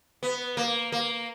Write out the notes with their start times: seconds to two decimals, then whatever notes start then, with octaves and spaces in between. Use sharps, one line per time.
0.23 B3
0.57 A#3
0.92 A#3